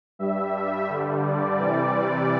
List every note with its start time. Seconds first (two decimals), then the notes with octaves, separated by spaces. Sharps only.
0.19 G2 G3 E5
0.88 G2 D3 G3
1.23 D5
1.58 C3 E3 G3 D5